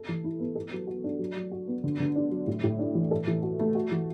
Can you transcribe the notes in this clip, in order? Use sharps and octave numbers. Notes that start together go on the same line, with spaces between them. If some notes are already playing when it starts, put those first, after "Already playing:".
Already playing: A4
E3
E4
B3
A4
F#3
F#4
D4
F#3
F#3
F#4
B3
D3
D3
D4
F#3
A2
A2
D4
E3
A4
E3
F#4
A3
F#4
E3